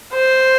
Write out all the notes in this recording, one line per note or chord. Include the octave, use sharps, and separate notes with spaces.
C5